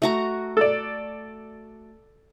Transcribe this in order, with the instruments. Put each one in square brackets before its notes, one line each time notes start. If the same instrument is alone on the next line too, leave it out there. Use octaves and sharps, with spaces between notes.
[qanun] A3 F#4 A#5
[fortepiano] A4 D5